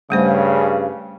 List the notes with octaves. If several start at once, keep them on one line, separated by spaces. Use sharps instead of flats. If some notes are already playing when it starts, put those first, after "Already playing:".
G2 C#3 G3 A3 C5